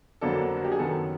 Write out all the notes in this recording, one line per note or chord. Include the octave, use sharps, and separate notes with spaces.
F2 D3 F#3 A#3 D4 A4
F#4
G4
G#4
F#2 D#3 F#3 B3 A4